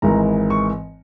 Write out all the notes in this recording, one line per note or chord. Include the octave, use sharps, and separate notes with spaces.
G#1 G#2 E3 A#5
C#6